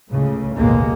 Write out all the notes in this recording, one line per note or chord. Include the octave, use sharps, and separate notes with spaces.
C#2 A2 C#3
A1 D#2 B2 G#3 A#3